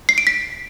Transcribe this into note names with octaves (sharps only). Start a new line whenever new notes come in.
C7
D7
B6